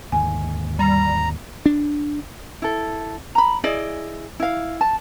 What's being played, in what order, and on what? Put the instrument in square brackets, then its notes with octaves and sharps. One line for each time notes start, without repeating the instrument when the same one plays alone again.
[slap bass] D#2 G#2 D3 [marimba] G#5
[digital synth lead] G3 [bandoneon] A#5
[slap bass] D4
[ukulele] E4 A4
A#5 B5
E4 G#4 D5 D#5
E4 F5
A5